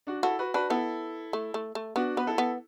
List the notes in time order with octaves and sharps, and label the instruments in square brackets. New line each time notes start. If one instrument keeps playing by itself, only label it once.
[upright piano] D4 F#4
[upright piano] E4 A4 [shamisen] F#4
[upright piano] F#4 B4
[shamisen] D4 [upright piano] F#4 B4
[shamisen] B3 [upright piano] E4 A4
[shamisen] A3
A3
A3
[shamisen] B3 [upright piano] D4 F#4
[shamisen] B3 [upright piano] B4
[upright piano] E4 A4
[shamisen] B3